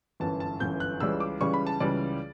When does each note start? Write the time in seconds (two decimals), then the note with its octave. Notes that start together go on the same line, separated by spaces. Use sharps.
0.20 G1 F#2 E3 A5
0.40 A5
0.60 G1 F#2 E3 G6
0.80 F#6
1.00 C#2 C#3 E3 G3 E6
1.20 D6
1.40 C#2 C#3 E3 G3 C#6
1.54 B5
1.67 A5
1.80 C#2 C#3 E3 G3 D5